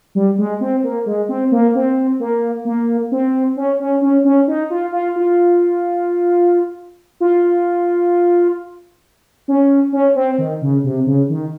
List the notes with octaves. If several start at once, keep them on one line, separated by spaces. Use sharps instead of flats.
G3
G#3
C4
A#3
G#3
C4
A#3
C4
A#3
A#3
C4
C#4
C#4
C#4
C#4
D#4
F4
F4
F4
F4
C#4
C#4
C4
D#3
C#3
C3
C#3
D#3